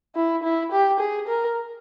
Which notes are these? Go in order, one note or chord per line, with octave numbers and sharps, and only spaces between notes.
E4
E4
G4
G#4
A#4